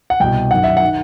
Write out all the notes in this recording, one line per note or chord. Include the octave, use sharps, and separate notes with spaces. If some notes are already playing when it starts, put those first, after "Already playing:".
F#5
C2 B2 G5
F#2 D#3 F#5
E5
D#3 F#5